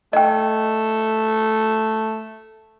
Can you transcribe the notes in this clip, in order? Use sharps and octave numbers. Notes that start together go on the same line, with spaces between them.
A3 D#5 G5